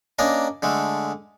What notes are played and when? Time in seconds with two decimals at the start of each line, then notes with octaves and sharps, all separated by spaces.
0.19 A#3 C#4 D4 A#4 D#5
0.62 D3 G#3 A3